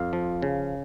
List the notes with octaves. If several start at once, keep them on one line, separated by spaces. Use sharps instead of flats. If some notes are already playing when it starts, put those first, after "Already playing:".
Already playing: F2 F5
F3
C#3